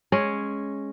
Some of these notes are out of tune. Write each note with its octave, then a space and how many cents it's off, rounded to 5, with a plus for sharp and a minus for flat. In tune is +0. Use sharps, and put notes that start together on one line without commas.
G#3 +0 C#4 -5